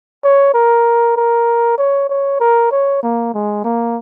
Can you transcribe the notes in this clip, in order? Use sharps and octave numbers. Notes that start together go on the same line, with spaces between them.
C#5
A#4
A#4
C#5
C#5
A#4
C#5
A#3
G#3
A#3